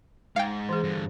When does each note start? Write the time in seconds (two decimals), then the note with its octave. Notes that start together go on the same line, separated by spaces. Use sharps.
0.36 G#2 E5 F5 G5
0.69 E3 G#4
0.83 G2 D3